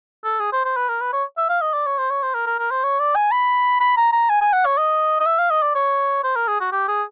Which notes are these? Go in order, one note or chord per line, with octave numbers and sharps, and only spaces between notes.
A4
G#4
C5
C5
B4
A#4
B4
C#5
E5
F5
D#5
D5
C#5
C5
C#5
C5
A#4
A#4
A#4
C5
C#5
D5
G#5
B5
B5
A#5
A#5
G#5
G#5
F#5
C#5
D#5
D#5
E5
F5
D#5
D5
C#5
C5
A#4
G#4
F#4
G4
G#4